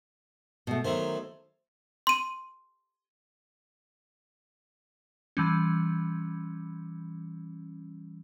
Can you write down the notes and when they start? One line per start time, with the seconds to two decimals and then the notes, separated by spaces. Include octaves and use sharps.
0.67 B2 A3
0.84 D#3 F#3 A3 C5
2.07 C6 D#7
5.37 E3 G3 C#4